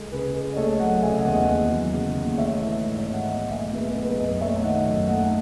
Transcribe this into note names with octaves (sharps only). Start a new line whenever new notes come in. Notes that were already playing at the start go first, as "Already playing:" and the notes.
Already playing: C#2 G#3 A4
C#3 G#4 B4
C#2
D#5
A3 A4 C#5
F#3 D#5 F#5
C#3 E5 G#5
D#5 F#5
E2
D#5 F#5
D#2
F#3
C#3
D#2
A3 C#5 E5
E3
G#2
C#5 E5
G#1
D#5 F#5
B1 D#5 F#5
A3 E5 G#5
B2 G#4 B4
B4 D#5
B1
B4 D#5
F#2 B4 D#5
A3 C#5 E5
D#3 D#5 F#5
F#2
A3 D#5 F#5